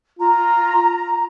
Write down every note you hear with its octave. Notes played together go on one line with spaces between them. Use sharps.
F4 A#5